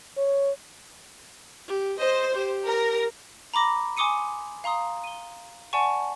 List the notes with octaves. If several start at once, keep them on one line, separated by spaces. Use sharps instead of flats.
C#5
G4
C5 D#5
G4
A#4
A#5 B5 D6 A#6
G#5 C6 D6 D#6 C#7 D#7
F5 A#5 C6 D#6
D#7 G7
D5 F#5 G#5 A5 C#6